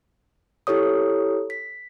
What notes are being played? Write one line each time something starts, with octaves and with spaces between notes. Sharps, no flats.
E4 G4 A4 C#5 D#6
B6